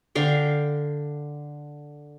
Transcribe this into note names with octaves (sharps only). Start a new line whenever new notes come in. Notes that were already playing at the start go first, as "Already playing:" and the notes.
D3 F5 G5